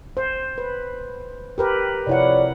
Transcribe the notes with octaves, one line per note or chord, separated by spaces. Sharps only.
C5
B4
G4 A#4 B4
C3 F3 E4 C#5 D5 F#5